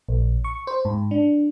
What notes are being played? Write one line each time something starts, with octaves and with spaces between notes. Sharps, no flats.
A#1
C#6
C5
G#2
D4